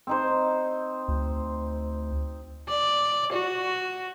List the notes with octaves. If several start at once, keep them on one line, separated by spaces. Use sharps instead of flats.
C4 D#4 C5
D2
D5
F#4